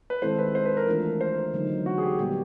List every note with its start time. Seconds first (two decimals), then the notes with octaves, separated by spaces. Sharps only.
0.10 B4
0.22 D#3 G#3 C4 E4 A4 C5
0.39 B4
0.55 C5
0.65 B4
0.77 A#4
0.87 E3 A3 D4 F4 A#4
1.21 C5
1.53 D3 F#3 A#3 D#4
1.86 F#4
1.98 G#4
2.03 G4
2.19 A#2 G3 B3 G4